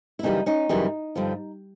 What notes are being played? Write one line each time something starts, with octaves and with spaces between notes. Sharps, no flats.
E4
F#2 C#3 E3 G3 C#4 D#4
C#4 D#4
F#2 C#3 E3 G3
G2 D3 F3